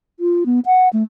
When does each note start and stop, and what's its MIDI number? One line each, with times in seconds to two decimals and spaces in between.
0.20 0.44 65
0.46 0.60 59
0.66 0.88 78
0.93 1.03 57